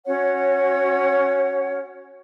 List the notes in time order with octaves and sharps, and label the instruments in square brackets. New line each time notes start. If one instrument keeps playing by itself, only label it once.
[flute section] C#4 F#4 C#5 F#5